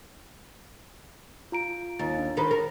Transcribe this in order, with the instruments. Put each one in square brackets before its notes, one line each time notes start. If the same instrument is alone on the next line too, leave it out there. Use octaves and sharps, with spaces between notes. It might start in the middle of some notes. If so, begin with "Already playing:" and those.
[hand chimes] F4 A#5 D7
[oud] D#2 [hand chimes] A6
[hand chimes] D4
[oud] D#3 B4 C5
A#4